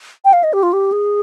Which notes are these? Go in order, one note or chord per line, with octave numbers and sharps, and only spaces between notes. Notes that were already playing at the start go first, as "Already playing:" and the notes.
G5
F5
D#5
G4
F4
G4
G#4